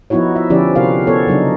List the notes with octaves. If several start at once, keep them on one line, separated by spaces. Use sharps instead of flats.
F3 B3 D#4 E4 F#4 C#5
E5
D3 F3 C#4 E4 G4 D5
C3 B3 F#4 G4 A#4 F5
B3 A4 C#5
C#3 F#3 D4 D#4